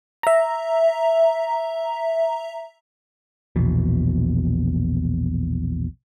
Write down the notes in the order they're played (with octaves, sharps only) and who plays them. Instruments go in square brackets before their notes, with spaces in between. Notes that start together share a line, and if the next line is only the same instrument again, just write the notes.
[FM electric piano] E5 A#5
[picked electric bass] A#1 E2 B2